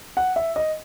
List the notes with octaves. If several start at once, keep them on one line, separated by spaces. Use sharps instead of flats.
F#5
E5
D#5